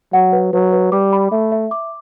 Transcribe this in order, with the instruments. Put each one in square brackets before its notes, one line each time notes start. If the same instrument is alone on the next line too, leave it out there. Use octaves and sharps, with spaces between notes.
[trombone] F#3 [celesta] F#5
[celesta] B4
[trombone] F#3 [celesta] B4
[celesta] B4
[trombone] G3 [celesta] D6
[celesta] B5
[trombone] A3 [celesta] E5
[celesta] E5
D6